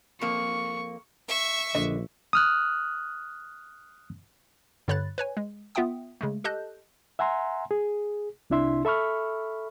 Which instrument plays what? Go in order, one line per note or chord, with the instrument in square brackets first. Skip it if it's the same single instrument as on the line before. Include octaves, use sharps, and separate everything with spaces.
[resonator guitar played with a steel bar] F2 A#3 [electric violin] C#6
[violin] E5 C#6
[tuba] A#1 [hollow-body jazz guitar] D3 D#5
[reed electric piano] D#6 F6 F#6
[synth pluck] G2 D3 C#5 B5 F#6 A6
B4 C#5 G#5
G#3
B3 F4 E5 F#5 G5 D#6
C#3 G#3 A3
G4 A4 D#5 A5 F#6 G6
[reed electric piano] E5 F#5 G#5 A#5 C6
G#4
C2 C3 D4 E4 E5 C6
A4 E5 B5 C#6 F6